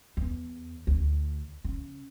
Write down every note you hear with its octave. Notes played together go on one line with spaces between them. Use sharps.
E2
D2
C#3